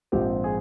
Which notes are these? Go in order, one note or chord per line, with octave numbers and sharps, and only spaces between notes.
A#1 G#2 F3 C4 G4
G#4